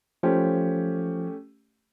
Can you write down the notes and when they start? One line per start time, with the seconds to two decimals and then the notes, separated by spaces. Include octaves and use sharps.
0.23 F3 A3 C#4 G4